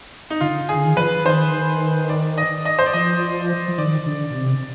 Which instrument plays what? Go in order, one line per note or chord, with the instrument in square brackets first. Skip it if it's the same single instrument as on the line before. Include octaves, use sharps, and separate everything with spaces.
[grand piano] D#4
[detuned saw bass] D3 [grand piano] F4
[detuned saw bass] D#3 [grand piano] G#4
[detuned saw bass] D3
D#3
[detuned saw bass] F3 [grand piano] B4
[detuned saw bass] F3
[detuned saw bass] D#3 [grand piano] C5
[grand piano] D5
D#5
D#5
C5
D5
[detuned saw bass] F3 [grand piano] D#5
[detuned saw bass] F3
[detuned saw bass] D#3 [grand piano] D5
[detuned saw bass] D3
B2
C3